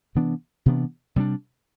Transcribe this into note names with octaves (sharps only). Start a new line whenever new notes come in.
C3 E3 B3 D4
C3 E3 B3 D4
C3 G3 D4